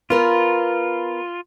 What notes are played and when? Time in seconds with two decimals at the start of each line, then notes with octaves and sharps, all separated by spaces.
0.10 B3 F4 A#4 B4